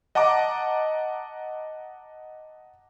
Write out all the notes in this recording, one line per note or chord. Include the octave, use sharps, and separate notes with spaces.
D#5 F#5 A5 A#5 D6